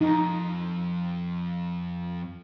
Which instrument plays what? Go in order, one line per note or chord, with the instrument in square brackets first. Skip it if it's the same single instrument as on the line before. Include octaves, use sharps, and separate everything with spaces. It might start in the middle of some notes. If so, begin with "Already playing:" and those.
[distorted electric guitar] F2 [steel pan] D#4